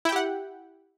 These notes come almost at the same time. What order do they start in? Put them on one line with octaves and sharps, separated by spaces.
E4 G5 G4 F#5